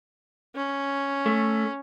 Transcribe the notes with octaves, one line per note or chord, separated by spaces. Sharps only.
C#4
A3